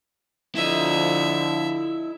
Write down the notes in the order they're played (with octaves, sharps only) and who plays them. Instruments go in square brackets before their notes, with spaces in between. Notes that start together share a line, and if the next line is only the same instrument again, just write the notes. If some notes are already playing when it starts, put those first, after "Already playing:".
[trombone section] D3 F3 [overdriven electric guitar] E4 D#5 [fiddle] E5